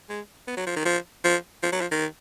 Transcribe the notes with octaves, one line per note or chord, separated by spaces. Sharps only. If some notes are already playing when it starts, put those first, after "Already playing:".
G#3
B3
F#3
F3
D#3
F3
F3
F3
F#3
F3
D#3